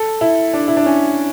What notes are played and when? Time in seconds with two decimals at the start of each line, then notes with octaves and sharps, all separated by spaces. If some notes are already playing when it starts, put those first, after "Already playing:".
Already playing: A4
0.21 E4
0.54 D4
0.68 E4
0.77 D4
0.86 C#4